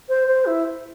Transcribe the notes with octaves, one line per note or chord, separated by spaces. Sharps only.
C5
C5
E4